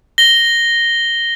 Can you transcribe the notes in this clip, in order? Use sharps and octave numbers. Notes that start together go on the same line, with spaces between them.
A#6 G7